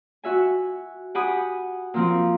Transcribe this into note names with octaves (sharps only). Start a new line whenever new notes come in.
F#4 E5 G#5
G4 F#5 G#5 B5 D#6
A#2 F3 C4